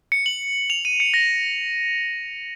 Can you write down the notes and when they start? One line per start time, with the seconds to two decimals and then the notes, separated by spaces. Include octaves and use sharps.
0.12 C#7
0.26 F#7
0.70 F7
0.85 D#7
1.00 C#7
1.14 A#6